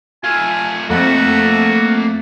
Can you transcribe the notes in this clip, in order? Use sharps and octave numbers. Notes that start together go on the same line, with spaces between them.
A3 F4 G#5
F2 A3 A#3 F#4 F#5